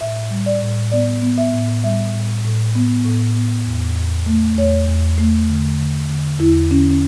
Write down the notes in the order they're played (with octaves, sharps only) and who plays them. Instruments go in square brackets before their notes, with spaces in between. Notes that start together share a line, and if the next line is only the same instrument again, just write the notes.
[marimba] A2 E5
G3
D5
A2
B3 D5
B3
E5
A2
G3 E5
A2
A2
B3
A2
B3
E2
E2
A3
E2 C#5
E2
A3
D3
D3
D3
E2 E4
D3 C#4
C#4